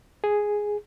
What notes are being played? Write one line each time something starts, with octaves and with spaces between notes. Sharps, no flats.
G#4